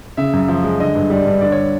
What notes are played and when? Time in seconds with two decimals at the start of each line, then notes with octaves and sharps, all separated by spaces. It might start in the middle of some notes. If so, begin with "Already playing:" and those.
0.17 C#3 E5
0.33 F#2
0.48 F3
0.64 G#3
0.80 D3 D#5
0.95 G2
1.10 G3
1.27 G2
1.41 D3 D5
1.52 C#5